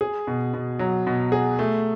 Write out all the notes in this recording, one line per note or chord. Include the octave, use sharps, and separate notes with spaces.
G#4
B2
B2
F#3
B2
G#4
A3